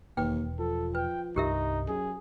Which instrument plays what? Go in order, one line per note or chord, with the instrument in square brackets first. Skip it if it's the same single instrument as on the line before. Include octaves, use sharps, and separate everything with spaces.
[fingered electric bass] E1 [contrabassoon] D#2 [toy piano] B4 G5
[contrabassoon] F3 [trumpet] A4
[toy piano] B4 [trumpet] G5
[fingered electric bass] C2 G2 [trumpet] D#4 [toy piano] G4 A#4 E5
[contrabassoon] F#2 [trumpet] G#4